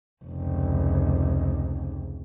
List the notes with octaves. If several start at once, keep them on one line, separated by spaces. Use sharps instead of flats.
F1 C#2